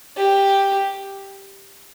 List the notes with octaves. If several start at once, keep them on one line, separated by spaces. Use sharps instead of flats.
G4